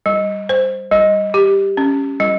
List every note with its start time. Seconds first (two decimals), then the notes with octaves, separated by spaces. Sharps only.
0.06 G3
0.49 C5
0.91 G3
1.34 G4
1.77 C#4
2.20 G3